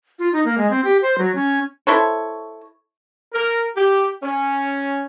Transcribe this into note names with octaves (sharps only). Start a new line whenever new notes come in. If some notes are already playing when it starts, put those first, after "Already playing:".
F4
D#4
A#3
G#3
C4
G4
C5
F#3
C#4
E4 A4 C5 C#5
A#4
G4
C#4